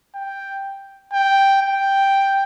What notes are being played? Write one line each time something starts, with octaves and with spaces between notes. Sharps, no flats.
G5
G5
G5